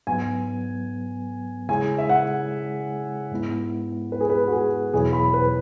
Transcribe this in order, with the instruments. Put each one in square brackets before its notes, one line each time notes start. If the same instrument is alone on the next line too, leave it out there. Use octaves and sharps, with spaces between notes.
[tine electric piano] G#2 F#3 B3 [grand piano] G#5
[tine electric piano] C#3 G#3 E4 G#4 C#5 [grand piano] G#5
[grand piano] E5
F#5
[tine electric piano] G#2 G#3 B3 E4
[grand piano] B4
G#4
B4
F#4
G#4
[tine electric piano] E2 B2 F#3 E4 C#5 [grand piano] G#4
[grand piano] B5
B4